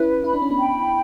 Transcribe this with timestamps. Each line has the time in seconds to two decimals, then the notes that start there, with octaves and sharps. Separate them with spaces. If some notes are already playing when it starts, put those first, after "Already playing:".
Already playing: C#4 E4 B4
0.24 E4 B5
0.34 D4
0.42 C#4
0.50 B3 D4
0.59 G5